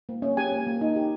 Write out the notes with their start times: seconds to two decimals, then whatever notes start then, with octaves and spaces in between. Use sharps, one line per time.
0.09 A#3
0.22 C#4
0.37 G4 G#5
0.52 A#3
0.67 A#3
0.81 D#4
0.96 G4